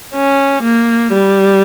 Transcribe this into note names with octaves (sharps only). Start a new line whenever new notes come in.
C#4
A#3
G3